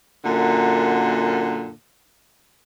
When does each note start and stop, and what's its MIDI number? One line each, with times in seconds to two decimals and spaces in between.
0.25 1.70 42
0.25 1.70 46
0.25 1.70 50